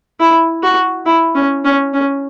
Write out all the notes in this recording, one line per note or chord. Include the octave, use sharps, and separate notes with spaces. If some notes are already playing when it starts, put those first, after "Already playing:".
E4
F#4
E4
C#4
C#4
C#4